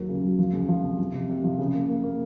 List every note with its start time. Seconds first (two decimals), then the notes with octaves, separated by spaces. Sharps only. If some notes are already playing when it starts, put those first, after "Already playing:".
Already playing: D#2 F#3
0.09 C#3
0.24 F#3
0.39 F3
0.53 C#2
0.68 F3
0.84 C3
0.99 F3
1.14 C3
1.29 C3
1.44 F3
1.59 C#3
1.74 A#3
1.89 A#3
2.04 A#3